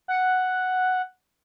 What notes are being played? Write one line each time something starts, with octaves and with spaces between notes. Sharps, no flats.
F#5